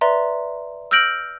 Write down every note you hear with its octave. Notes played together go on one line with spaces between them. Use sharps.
B4 D5 E5 A#5 C6
E6 F6 G6 A#6 D7 F#7